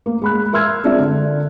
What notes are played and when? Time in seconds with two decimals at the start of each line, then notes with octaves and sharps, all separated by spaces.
0.06 A#3
0.22 G#3 B5 F#6
0.53 A#4 E5 C6 E6 F6 G#6
0.84 G#3 C4 D4 F4 D5 E5
0.99 D3